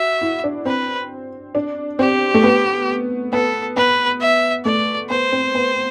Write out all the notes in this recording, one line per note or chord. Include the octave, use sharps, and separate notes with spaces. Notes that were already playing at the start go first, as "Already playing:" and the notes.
Already playing: F#4 E5
E4
D4
C4 B4
D4
C4 G4
A3
B3
B3 A4
B3 B4
E5
A3 D5
B3 C5
C4
B3